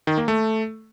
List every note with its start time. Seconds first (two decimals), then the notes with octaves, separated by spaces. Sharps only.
0.07 D#3
0.18 A#3
0.28 A3